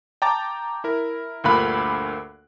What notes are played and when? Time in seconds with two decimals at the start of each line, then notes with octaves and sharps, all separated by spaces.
0.22 G5 A5 A#5 D6 A6
0.84 E4 A#4
1.44 D2 G2 A#2 F5 B5 F#6